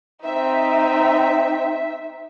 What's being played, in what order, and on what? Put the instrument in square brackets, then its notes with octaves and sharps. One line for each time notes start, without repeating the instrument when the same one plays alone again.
[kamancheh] C4 D#4 [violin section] E5